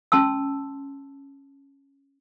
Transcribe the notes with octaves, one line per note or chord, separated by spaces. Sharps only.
C#4 A5 C6 E6